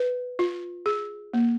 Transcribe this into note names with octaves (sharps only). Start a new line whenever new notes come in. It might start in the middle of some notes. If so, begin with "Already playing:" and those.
Already playing: B4
F4
G#4
A#3